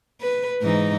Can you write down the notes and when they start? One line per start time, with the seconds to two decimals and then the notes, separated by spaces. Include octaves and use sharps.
0.21 B4
0.62 G#2 E3 D#4